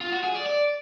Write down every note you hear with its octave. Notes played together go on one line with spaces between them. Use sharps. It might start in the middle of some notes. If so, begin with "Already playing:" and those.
F4
F#4
G#4
D5
D5